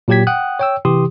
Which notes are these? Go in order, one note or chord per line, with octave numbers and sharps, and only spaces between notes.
A#2 F#3 G4 G5 G#6 B6
F#5 G5 D#6 F#6
C#5 G5 E6
C3 E3 G4 C6 D#6